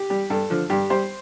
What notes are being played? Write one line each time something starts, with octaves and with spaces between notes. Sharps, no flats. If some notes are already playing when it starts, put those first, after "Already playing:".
Already playing: G4
G3
G2 A4
D3 F3
G2 G4
G3 C5